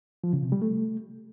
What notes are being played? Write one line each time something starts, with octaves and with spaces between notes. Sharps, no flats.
F3
C#3
C3
G3
A3